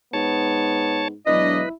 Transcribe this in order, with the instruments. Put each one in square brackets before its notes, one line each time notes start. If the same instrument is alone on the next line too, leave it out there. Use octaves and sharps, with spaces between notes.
[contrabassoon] G#2 [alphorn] B3 [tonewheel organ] C#5 A5
[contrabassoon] E1 [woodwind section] F#3 D4 D#5 [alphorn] E4 [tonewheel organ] B4